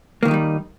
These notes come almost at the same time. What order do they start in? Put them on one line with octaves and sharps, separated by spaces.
A#3 D#3 D#4 F#3 G3